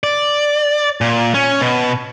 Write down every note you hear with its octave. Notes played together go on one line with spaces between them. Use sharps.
D5
A#2
C#4
B2